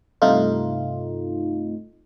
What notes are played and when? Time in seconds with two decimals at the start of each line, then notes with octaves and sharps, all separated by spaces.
0.22 G2 C3 A3 D#4 F4